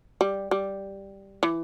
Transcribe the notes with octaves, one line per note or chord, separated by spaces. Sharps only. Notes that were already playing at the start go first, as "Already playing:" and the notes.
G3
G3
E3